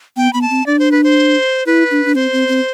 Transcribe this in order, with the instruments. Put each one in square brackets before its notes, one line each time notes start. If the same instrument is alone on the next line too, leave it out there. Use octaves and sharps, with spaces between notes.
[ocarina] B3 [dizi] G5
[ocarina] B3 [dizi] B5
[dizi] A5
[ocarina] C4
[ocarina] D4 [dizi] D5
[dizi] C5
B4
C5
[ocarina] E4 [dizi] B4
[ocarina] D4
D4
[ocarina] C4 [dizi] C5
[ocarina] C4
C4